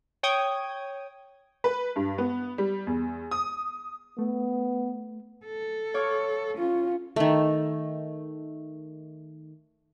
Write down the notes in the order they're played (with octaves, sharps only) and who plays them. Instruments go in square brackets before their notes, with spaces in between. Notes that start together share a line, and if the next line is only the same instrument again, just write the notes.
[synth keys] C#5 G5 D#6 G#6
[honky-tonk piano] B4
G2
B3
G3
E2
D#6
[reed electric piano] A3 [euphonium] B3
[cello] A4
[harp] C#5 F5 D6
[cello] C#4 [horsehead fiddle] F4
[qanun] D#3 A3